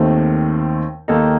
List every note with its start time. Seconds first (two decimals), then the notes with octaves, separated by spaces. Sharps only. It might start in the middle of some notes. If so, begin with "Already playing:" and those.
Already playing: D#2 D#3 A3 C4
1.08 D#2 D#3 A#3 D#4 A4